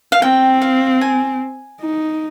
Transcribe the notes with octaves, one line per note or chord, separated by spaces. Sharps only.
F5
C4 G5
F5
G#5
D#4